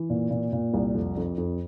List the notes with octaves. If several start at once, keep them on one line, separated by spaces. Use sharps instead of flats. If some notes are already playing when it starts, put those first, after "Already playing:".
Already playing: E3
A#2
A#2
A#2
C2
F2
F2
F2